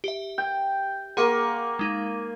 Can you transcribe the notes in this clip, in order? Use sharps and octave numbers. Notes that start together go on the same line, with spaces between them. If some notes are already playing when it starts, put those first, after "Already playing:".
G4 E5
G5
A#3 G#4 F#5 C6 C#6
G#3 D#4